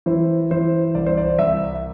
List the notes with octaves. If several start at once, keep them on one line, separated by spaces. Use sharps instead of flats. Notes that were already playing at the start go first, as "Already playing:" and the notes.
E3 C5
E3 C5
C2 D5
C5
D5
C2 E5